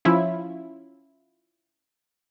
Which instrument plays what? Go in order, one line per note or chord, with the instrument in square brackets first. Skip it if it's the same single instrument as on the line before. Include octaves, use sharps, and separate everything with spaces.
[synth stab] F3 C#4 E4 F4